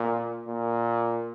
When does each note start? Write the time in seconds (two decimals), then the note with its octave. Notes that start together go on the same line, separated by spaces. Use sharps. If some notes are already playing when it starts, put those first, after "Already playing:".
Already playing: A#2
0.47 A#2